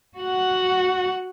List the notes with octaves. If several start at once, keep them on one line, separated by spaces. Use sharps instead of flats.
F#4 F#5